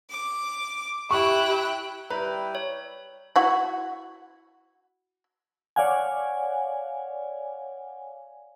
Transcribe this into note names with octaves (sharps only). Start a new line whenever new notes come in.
D6
E4 G4 G5 C#6 F#6
G3 E4 B4 G5 A#5
C#5
E4 F#4
C#5 D5 F5 F#5 G#5